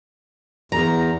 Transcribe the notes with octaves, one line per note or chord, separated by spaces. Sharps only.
E2 A#5